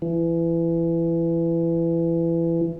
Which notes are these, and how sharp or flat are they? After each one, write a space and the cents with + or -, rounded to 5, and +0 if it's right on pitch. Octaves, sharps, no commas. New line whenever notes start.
E3 +20